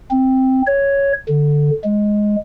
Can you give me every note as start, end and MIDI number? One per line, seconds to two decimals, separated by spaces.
0.11 0.62 60
0.67 1.13 73
1.28 1.71 50
1.84 2.36 56